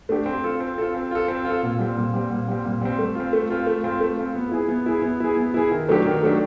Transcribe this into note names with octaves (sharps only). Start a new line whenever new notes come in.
A3 D4 G4
C4
F4 A4
C4
F4 A4
C4
F4 A4
C4
F4 A4
A#2
G3 C4
A#2
G3 C4
A#2
G3 C4
A#2
G3 C4
A3
C4 F4
A3
C4 F4
A3
C4 F4
A3
C4 F4
B3
E4 G#4
B3
E4 G#4
B3
E4 G#4
B3
E4 G#4
D#3
F#3 A3 D4 G4
D#3
F#3 A3 D4 G4